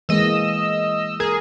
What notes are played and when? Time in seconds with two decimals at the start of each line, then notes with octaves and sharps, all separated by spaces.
0.09 E3 G#3 A#3 D#5 E6
1.20 G#4 A#4